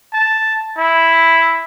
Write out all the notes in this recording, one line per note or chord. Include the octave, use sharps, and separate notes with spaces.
A5
E4